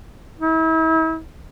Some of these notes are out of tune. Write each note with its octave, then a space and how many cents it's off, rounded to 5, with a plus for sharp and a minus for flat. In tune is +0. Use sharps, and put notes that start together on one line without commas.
E4 -40